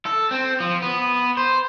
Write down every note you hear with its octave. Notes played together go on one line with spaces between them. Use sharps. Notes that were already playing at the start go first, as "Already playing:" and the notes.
A4
C4
F3
B3
C5